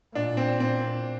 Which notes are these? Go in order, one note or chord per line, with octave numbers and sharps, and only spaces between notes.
A#2 D4
C4
C4